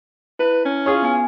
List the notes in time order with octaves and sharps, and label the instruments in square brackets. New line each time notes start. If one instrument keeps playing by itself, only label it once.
[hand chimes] E4 [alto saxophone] B4
[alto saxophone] C#4
[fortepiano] F4 G#4 C#5
[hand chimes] B3 G#5